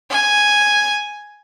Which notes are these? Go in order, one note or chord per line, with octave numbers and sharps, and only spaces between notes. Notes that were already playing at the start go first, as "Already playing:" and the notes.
G#5